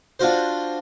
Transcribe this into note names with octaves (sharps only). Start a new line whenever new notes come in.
D4 F4 F#4 C5